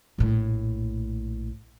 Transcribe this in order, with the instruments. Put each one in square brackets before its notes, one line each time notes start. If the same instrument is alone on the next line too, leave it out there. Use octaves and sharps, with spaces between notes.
[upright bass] A#1 A2